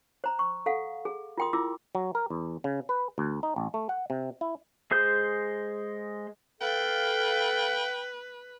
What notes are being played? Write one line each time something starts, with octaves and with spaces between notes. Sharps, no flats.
C5 A#5
C#6
A4 F5 F#5
G#4
F4 A#4 G5 C6 D#6
E4 F4 D6 E6
F#3
A#4
E2
C#3
B4
D2
D#4
A1
A3
F#5
C3
E4
G#3 G#4 C5 G6
A4 B4 F5 G5